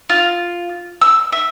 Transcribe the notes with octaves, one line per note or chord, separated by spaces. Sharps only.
F4
E6
E5